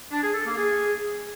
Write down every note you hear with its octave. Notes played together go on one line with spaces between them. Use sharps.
D4
G#4
A4
A#3
G#4